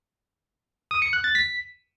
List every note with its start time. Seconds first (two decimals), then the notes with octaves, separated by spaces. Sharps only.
0.91 D#6
1.02 C#7
1.13 F#6
1.24 A6
1.35 B6